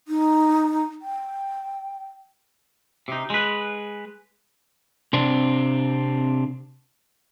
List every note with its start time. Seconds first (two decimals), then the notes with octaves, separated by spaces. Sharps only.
0.08 D#4
1.02 G5
3.08 C3 D#4
3.30 G#3 B4
5.13 C3 C4 D4